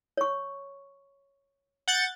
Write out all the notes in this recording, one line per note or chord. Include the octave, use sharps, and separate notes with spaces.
C#5 C#6
F#5 G6 A6